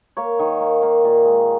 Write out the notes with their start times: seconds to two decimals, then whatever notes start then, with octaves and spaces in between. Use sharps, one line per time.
0.17 A#3 C#5
0.39 D#3
0.60 A#3
0.82 A#3
1.05 A#2
1.25 G#3